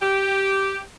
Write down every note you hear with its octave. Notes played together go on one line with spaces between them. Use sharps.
G4